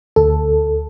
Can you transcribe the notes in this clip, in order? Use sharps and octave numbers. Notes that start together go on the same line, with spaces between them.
D2 A4